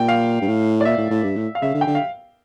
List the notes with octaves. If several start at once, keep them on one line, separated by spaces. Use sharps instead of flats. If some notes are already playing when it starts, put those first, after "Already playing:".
Already playing: A#2 G5
F5
G2
A2
D5
A#2 E5
A2
A2
G2
A2
F5
C#3 E5
D3
G5
D3
F5